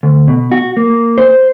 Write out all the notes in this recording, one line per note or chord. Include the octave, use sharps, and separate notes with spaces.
D2
B2
F#4
A#3
C5